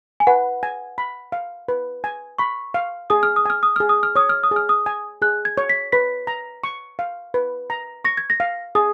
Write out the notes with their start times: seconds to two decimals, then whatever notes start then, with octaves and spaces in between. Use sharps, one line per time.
0.20 G#5
0.27 B4 F#5
0.63 G#5
0.98 B5
1.32 F5
1.68 B4
2.04 G#5
2.38 B5 C#6
2.74 F5
3.10 G#4 D#6
3.23 F6
3.36 D#6
3.45 G#5 F6
3.63 D#6
3.76 G#4 F6
3.89 D#6
4.03 F6
4.16 C#5 D#6
4.29 F6
4.43 D#6
4.51 G#4 F6
4.69 D#6
4.86 G#5
5.22 G#4 F#6
5.45 G#6
5.58 C#5
5.69 B6
5.92 B4 B6
6.27 A#5
6.64 C#6
6.99 F5
7.34 B4
7.70 A#5
8.05 C#6 A#6
8.17 G#6
8.30 A#6
8.40 F5
8.75 G#4 D#6